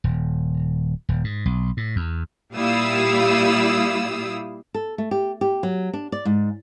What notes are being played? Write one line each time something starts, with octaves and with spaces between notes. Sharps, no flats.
D#1
D#1
G#2
B1
A2
E2
A#2 G3 E4 F5 D#6 E6
A4
A3
G4
G4
F#3
D4
D5
G#2